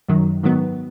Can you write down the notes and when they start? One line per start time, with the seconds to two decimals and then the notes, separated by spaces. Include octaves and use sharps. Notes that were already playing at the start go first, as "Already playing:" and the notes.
0.09 F#2 D#3 F#3
0.43 G#2 D#3 F#3 B3